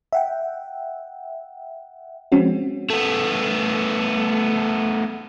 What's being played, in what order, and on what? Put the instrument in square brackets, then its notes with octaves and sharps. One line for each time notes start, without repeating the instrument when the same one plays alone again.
[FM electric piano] E5 F#5 G5
F3 G#3 C4 C#4 F#4
[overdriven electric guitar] A3 B3